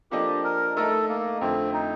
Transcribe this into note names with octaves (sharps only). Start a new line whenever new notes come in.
F3 A#3 D4 G4 A4 D#5
A#4
A3 D#4 A4 A#4 D#5
A#3
F2 D3 A3 C4
D#4